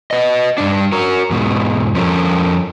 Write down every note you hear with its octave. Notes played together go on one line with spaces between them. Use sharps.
B4 D#5
G2 A#2 D4
F#4 A#4
E2 G#2 B2
F2 F3 C#4 A4 A#4